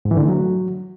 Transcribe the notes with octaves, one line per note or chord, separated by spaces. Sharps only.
G#2
E3
D3
A3
F#3